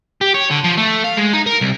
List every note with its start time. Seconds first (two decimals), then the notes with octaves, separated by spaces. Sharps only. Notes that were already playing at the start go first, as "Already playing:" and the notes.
0.21 G4
0.34 C#5
0.50 D3
0.64 F3
0.78 A3
1.05 F5
1.17 G#3
1.33 D#4
1.46 A#4
1.61 C2